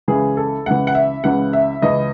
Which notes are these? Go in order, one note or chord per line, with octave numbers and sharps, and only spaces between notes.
C#2 C#3 E3 G#4
A4
C#2 C#3 E3 F#5
F#5
E5
C#2 C#3 E3 F#5
E5
C#2 C#3 E3 D#5